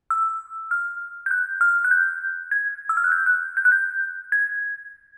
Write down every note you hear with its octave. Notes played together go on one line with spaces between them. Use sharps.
E6
F6
G6
F#6
F6
F#6
G6
G#6
E6
F6
F#6
G6
F#6
G6
F#6
G6
G#6